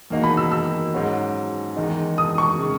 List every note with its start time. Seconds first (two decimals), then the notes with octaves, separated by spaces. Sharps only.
0.10 E2 D#3 A#3 D#4 F#4
0.24 B5
0.37 E6
0.51 E6
0.93 G#2 F#3 C#4 F#4
1.77 E2 D#3 G#3 D#4
2.18 D#6
2.38 C#6
2.59 C#3 G#3 D#4